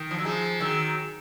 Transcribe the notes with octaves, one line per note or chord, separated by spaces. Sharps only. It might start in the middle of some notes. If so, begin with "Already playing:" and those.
Already playing: D#3
F3
F#3
F3 G#3
D#3 F#3